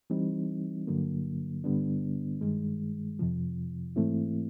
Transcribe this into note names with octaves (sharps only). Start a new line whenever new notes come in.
E3 G3 C4 D#4
G2 D3 F#3 A#3
G2 D3 G3 B3 D4
G2 D#3 G#3
F2 C3 F3
G#2 E3 A3 C4 E4